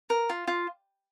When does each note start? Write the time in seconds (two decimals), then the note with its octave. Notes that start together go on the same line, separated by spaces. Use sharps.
0.10 A#4
0.30 F4
0.48 F4